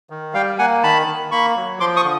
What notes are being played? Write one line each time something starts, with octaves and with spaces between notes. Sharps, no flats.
D#3
G3 F5 G5
A#3 F#5 G#5
D#3 A5 B5
D#3
A#3 B5 C#6
F#3
F3 C6 D6
C#6 D#6
D3